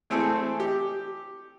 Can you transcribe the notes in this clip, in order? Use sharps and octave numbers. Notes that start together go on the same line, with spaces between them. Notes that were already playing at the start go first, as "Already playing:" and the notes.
E3 A3 C4 G#4 A4
G4